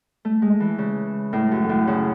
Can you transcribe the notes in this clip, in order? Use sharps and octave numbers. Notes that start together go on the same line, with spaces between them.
A3
G#3
E3
C#3
A2
F#2
A2
C#3